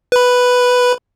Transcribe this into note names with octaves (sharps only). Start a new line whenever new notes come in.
B4 B5